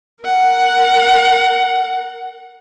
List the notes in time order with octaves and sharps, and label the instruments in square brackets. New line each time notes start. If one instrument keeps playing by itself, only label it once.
[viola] A#4 F#5